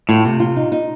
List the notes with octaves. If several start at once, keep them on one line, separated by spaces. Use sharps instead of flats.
A2 F4
C3
F4
D#4
D#4